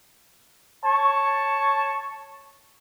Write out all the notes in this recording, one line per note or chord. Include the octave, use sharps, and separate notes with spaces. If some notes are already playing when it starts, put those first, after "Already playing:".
C#5 A5 C#6